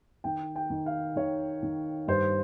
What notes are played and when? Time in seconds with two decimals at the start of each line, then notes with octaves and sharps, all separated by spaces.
0.24 D#3 G5
0.56 G5
0.70 D#3
0.86 F5
1.16 D#3 C#5
1.63 D#3
2.08 G2 C5